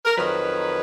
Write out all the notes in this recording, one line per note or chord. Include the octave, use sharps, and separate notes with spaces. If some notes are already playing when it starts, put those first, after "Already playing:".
A#4
F2 D#3 F#3 B4